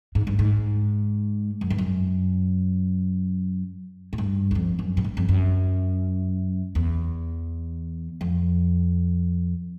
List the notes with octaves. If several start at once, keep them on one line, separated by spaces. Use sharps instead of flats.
G#2
G2
G#2
F#2
G2
F#2
G#2
G2
E2
F2
F#2
G#2
G2
F2
F#2
E2
F2